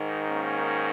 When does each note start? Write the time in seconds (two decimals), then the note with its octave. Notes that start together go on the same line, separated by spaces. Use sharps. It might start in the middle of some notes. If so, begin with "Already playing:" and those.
Already playing: G#2 D#3
0.28 A#3 C#4